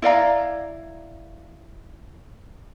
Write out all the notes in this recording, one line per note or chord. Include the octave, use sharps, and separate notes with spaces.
E4 D5 F5 A#5